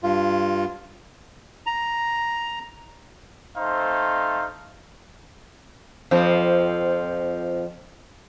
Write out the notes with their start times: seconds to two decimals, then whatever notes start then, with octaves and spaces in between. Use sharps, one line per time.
0.03 G2 F4
1.66 A#5
3.58 A3 C4 D#4 C5 F5
6.11 F2 F3 C4